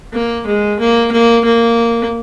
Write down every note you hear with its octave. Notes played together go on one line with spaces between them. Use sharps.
A#3
G#3
A#3
A#3
A#3